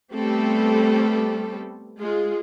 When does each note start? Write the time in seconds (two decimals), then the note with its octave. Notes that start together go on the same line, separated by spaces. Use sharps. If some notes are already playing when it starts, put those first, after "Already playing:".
0.12 G3 A3 B3 C4 G4 A4
1.98 G#3 F4 G#4